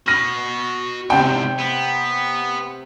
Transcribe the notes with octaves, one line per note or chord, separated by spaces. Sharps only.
F#4 B5 F6 A#6 D#7
E2 G#2 C3 G5
B3